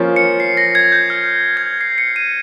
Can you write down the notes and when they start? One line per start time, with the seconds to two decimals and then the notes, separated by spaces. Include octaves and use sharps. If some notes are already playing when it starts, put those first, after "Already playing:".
Already playing: F3 A#3 C#4
0.16 C#7
0.40 C7
0.57 A#6
0.75 G#6
0.92 G6
1.10 F6
1.57 G#6
1.81 C7
1.98 C#7
2.16 D#7